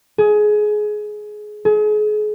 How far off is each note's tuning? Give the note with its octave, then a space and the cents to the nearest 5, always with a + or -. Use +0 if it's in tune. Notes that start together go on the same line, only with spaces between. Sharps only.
G#4 +20
G#4 +35